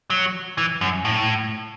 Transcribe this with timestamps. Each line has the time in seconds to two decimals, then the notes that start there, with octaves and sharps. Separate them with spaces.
0.10 F#3
0.58 E3
0.81 F#2
1.05 A2